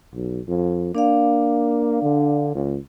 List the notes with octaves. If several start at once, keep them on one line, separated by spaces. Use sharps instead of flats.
B1
F2
A#3 D4 D5 F5
D3
C#2